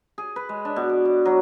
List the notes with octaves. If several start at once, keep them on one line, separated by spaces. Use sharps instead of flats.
G#4
B4
G#3
D4
B2
D5
D5
F#3